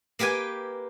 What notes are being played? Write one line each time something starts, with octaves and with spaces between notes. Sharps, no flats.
A#3 G4 B4 G5 G#5